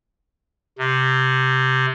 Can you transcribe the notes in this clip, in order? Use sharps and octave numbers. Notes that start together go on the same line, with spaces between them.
C3